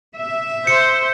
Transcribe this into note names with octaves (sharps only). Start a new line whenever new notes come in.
E5
C5 C#7